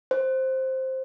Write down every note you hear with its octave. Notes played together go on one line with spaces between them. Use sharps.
C5